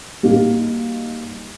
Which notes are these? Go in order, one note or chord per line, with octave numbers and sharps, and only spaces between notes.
G3 A#3 D#4 F#4